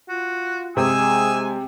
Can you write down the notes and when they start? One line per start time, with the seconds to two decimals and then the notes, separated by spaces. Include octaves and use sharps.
0.09 F4 F#4
0.77 C3 G#3 G#4 G#5 E6